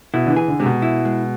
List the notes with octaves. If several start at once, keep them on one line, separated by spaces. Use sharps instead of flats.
B2 E4
D3
E3
G#4
D3
C3 G#3
B2
E4
G#3